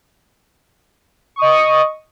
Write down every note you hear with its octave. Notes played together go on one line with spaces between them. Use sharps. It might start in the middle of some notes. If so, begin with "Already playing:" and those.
D#5 C#6 D#6